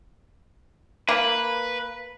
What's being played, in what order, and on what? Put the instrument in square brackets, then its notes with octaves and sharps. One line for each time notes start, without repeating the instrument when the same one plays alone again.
[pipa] A#3 [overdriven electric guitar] B4